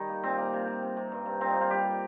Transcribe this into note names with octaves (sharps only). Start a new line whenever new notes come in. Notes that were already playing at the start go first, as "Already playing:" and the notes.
Already playing: D#3 G3 D#4
A#3
A#2 C4
A#3
C3
A#3
C3
C3
G2
G2
A#2 C4
D#4
A#3
F4
G3 G4